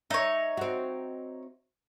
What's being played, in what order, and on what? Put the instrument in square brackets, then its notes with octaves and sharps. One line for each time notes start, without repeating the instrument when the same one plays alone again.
[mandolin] D#4 C#5 [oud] E5
[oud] C4 F#4